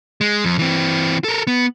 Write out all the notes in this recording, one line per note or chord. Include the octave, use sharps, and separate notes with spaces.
G#3
F2
E3 C4
A4 A#4
B3